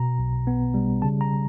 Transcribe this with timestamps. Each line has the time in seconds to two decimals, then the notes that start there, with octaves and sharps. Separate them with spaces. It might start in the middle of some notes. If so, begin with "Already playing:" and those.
Already playing: B2 A#5
0.19 B1
0.47 B3
0.74 G3
1.02 C#3 A5
1.21 A#5